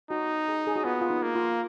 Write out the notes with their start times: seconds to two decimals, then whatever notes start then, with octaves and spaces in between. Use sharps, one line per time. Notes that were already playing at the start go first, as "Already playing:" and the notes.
0.10 D#4 F#4
0.48 G#4
0.67 G#4
0.76 F#4
0.85 B3 F4
1.01 F4
1.10 D#4
1.23 A#3
1.35 F4